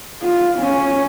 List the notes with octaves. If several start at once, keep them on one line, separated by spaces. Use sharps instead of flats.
F4
C#4